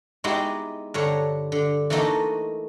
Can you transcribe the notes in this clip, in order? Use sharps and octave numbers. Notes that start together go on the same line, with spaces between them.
G#3 B3 D#4 E4 F#4 G4
G2 D3 C#5 A#5
D3
E3 A3 A#3 D#4 F#4 A4